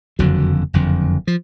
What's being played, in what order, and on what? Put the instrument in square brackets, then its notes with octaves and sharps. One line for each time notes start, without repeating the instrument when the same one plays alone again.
[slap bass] F#1 F2 D3 F#3
F#1 F2 D3
F3